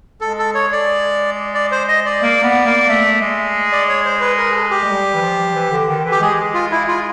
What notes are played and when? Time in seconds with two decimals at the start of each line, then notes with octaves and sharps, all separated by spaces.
0.21 G#3 A4
0.39 A4
0.54 C#5
0.72 D5
1.55 D5
1.72 C5
1.88 D#5
2.05 D5
2.22 A#3
2.43 B3
2.66 A#3
2.88 A3
3.21 G#3
3.72 D5
3.88 C#5
4.05 C5
4.21 B4
4.38 A#4
4.50 G#4
4.55 A4
4.71 G4
4.84 G#3
4.88 G3
5.14 E3
5.22 F3
5.55 E3
5.71 D3
5.88 D#3
6.05 E3
6.11 G4
6.21 G#3 G#4
6.54 F4
6.72 E4
6.88 F4